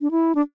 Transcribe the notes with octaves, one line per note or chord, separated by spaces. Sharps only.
D4
E4
D4